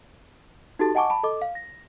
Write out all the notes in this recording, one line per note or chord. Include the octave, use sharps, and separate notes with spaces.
D#4 F#4 G4 A4 A5 A6
D#5 F#5 G#5 A5 C#6 D6
A5 B5
A4 D#5 D6
F5
A#6